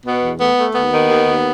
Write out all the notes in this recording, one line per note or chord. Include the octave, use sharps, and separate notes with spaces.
B2 B3
E2
A3 B3
A3
D#2 B3
D#3
D#2
D#2